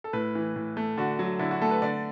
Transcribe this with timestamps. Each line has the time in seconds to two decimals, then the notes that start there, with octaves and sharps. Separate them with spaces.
0.04 A4
0.13 A2 B4
0.35 E3
0.56 A2
0.77 A3
0.97 D3 F#4
1.19 F#3
1.39 D3 E4
1.51 F#4
1.62 A3 A4
1.71 B4
1.82 D3 D5